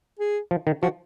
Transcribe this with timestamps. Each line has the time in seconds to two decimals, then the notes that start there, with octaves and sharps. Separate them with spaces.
0.19 G#4
0.51 F3
0.67 D#3
0.83 F3 F#4